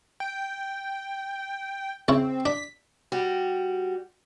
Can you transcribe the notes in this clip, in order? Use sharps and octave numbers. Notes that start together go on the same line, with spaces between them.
G5
C#3 C4 E4 C#5
D4 B6
G3 F#4 G4